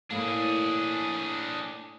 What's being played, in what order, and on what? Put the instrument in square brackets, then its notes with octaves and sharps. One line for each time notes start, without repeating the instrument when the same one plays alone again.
[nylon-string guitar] A2 A#3 [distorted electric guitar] D4 G#4